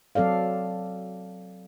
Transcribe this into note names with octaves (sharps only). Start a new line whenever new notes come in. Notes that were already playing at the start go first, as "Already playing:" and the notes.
F#3 C4 A4 D5 F5